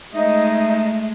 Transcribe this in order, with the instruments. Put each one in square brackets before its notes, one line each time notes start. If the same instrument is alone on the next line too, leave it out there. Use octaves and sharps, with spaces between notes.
[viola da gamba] G#3 A3 [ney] D#4 [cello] D#5 [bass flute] E5